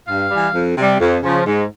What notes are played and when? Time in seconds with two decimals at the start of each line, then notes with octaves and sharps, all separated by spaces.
0.08 G2 F5
0.31 E3 G3
0.55 F2
0.77 C3
0.82 G3
1.00 F2
1.23 C#3 F3
1.47 G#2